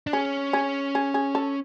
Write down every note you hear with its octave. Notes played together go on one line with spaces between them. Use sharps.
D4
C#4 G#4
G#4
G#4
G#4
A4